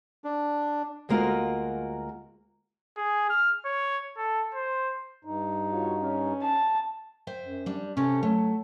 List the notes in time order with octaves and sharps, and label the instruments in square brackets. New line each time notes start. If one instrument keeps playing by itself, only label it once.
[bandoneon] D4
[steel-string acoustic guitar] D2 G#3 A#3 F4 F#4 A#4
[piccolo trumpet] G#4
F6
C#5
A4
C5
[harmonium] G2 D#4
[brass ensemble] F4 F#4 C#5
C#4
[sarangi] A5
[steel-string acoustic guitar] C5 E5 G5
[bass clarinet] F#2
[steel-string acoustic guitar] G3 D4
[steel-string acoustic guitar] C3 G4 A4 [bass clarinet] C#4
[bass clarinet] F#3 [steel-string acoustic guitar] A3